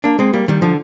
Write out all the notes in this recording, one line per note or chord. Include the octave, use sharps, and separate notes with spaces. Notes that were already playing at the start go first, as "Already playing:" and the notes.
A#3 D4
G#3 C4
G3 A#3
D#3 G3
D3 F3